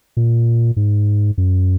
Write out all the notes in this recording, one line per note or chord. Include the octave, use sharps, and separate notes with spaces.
A#2
G#2
F#2